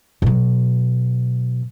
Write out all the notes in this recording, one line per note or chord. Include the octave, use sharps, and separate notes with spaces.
B2 F#3